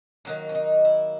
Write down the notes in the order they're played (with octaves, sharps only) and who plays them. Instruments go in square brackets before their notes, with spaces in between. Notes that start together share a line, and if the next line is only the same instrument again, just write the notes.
[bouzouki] D#3 F#3 A#3 C#4
C#4
D#4
E4